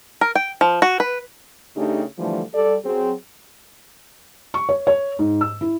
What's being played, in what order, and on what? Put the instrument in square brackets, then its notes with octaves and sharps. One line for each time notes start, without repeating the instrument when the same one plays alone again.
[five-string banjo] A#4
G5
F3
F#4
B4
[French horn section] C#3 A3 D4 D#4 G4
D3 E3 F3 G3 A3 D4
G3 A4 D5
F#3 C4 G#4
[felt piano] C#6
C#5
C#5
G#2
E6
E4